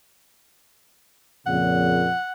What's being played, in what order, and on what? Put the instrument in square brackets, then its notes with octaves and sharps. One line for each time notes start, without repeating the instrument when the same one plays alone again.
[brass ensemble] F2 A#2 C#3 [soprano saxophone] F#5